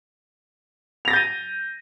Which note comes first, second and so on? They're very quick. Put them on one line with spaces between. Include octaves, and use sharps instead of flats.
F7 A#6 A6 G6 D#7